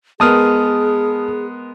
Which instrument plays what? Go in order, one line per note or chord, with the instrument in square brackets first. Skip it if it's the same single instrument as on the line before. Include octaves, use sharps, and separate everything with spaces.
[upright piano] G#3 B3 A#4 [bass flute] G#4 [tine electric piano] A5 D#6 F6